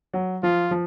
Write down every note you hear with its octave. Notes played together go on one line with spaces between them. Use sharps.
F#3
F3 F4
F3